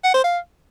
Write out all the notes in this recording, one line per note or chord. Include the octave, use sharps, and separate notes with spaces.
F#5
C5
F5